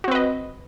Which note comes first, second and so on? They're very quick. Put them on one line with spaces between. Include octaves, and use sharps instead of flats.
F#4 C4 B4 D#5